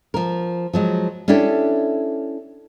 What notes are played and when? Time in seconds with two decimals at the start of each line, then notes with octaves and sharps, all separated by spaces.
0.14 F3 A#4
0.73 F3 F#3 G#3
1.28 C#4 D4 E4 G4 A4